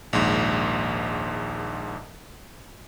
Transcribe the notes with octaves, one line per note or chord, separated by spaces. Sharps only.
A#1 D#2 G#2